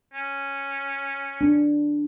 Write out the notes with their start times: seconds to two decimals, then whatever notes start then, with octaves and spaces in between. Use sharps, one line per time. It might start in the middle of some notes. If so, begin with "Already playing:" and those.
0.13 C#4
1.41 D4